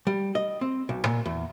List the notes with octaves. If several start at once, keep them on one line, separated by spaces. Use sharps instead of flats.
G3
D#5
C4
B1
A#2
E2